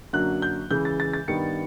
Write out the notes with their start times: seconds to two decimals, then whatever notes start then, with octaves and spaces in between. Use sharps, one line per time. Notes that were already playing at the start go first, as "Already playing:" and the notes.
0.13 F#2 D3 F#3 A#3 F#6
0.42 G6
0.71 C#3 E3 G#3 G6
0.85 A6
1.00 A6
1.13 A6
1.28 G2 D#3 G3 B3 C#7